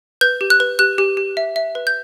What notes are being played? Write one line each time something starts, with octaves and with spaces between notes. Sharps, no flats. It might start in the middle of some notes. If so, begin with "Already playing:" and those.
B4 G6
G4
F#6
B4
G4 F#6
G4
G4
E5
E5
B4
G6